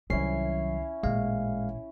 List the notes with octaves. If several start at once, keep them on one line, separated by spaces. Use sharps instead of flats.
C2 D#3 F#3 C#4 E4 C7
A1 A#2 G#3 F5